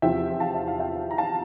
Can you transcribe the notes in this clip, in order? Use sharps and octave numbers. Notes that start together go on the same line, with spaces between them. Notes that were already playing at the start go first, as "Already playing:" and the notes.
E2 C3 F3 C4 E5 G5
F5 A5
E5
F5
E5 G5
A#5
F5 A5